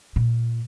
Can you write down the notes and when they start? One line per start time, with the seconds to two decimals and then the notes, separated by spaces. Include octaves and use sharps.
0.16 A#2